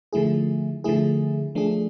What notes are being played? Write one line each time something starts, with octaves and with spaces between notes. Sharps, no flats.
D3 F3 A3 E4 G#4
D3 F3 A3 E4 G#4
F3 A3 D4 G#4